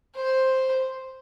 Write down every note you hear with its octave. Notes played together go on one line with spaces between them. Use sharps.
C5